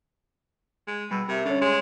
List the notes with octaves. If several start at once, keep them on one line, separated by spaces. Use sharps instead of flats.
G#3
B2 G3 B5 E6
C3 A#4 E5
D3 C#4 C#5
G#3 C6